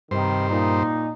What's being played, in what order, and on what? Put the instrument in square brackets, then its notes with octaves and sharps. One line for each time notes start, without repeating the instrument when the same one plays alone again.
[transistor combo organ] G2 C5 [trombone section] C3 D#3
[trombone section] A#2 D#4